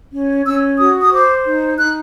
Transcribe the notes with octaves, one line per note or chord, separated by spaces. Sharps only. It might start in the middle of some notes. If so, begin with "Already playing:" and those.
C#4
C#4 E6
F#4 D#6
D#6
C5 D6
D#4
D#4 F#6